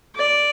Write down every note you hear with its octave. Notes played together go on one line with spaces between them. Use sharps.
D5